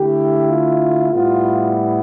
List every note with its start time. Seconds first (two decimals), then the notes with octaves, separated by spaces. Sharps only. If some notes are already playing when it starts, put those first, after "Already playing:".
Already playing: D3 A3 E4 G4
0.49 F4
1.12 A2 G3 B3 E4 F4